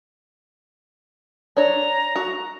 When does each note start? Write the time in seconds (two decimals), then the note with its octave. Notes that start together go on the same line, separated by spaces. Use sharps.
1.57 D4 C#5 A#5
2.16 F#4